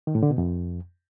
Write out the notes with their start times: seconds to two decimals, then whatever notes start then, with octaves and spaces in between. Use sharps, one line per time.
0.07 D#3
0.15 A2
0.23 D3
0.30 B2
0.38 F2